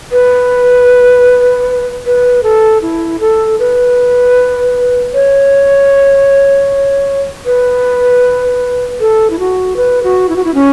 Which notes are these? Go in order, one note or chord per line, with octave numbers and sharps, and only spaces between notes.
B4
B4
A4
E4
A4
B4
C#5
B4
A4
E4
F#4
B4
F#4
E4
F#4
E4
C#4